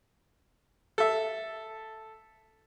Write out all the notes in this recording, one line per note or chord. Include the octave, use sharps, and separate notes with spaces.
A4 E5